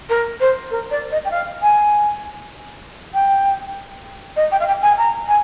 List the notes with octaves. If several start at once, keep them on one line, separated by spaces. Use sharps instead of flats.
A#4
C5
A#4
D5
D#5
G5
F5
G#5
G5
D#5
G5
F5
G5
G#5
A#5
G#5